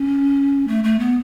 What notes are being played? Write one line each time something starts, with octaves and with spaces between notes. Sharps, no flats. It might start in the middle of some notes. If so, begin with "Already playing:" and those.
Already playing: C#4
A3
A3
B3